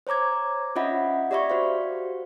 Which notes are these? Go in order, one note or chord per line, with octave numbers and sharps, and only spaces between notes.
C5 C#5 A#5 D6 G#6
C#4 F4 D#5 E5 F#5 B5
G4 D5 E5 B5 C#6
F#4 C5 F5